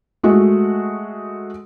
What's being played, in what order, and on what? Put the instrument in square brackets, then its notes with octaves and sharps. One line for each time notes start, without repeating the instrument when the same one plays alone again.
[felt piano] G#3 A3 F#4